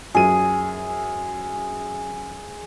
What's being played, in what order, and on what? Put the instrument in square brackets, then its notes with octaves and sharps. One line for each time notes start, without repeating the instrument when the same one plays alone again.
[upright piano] F#2 D#7 [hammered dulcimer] G#4